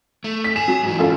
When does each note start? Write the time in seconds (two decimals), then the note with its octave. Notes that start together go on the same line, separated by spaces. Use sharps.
0.24 A3
0.44 B6
0.56 G#4 E7
0.68 F#3
0.84 G#2 E3
0.99 F#2 F4 A4